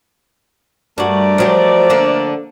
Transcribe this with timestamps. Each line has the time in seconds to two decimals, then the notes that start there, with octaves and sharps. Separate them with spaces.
0.98 G2 A3 F#4 A#4 D5
1.38 F3 F#3 G4
1.90 D3 A#3 D4